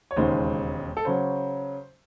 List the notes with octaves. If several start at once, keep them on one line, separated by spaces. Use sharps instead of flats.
C#5
E1 D#2 C#3 G#3 C5
A4
C#3 F#3 C5